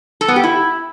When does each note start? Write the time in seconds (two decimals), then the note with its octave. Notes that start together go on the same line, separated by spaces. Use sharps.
0.21 A4
0.28 B3
0.36 G4
0.43 E4